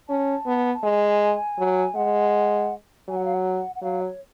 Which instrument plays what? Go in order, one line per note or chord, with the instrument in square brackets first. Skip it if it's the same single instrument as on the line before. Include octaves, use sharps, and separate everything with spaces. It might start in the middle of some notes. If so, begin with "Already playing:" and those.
[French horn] C#4 [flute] A5
[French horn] B3
[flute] A5
[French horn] G#3 [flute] G#5
[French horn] F#3
[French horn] G#3 [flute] F#5
[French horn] F#3 [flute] G#5
[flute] F#5
F5
F#5
F#5
[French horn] F#3 [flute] F5
[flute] C#5